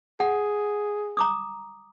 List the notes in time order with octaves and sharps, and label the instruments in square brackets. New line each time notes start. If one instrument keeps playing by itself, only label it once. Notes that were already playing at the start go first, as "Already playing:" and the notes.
[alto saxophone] G#4 [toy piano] F#5
[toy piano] A#5 D6 D#6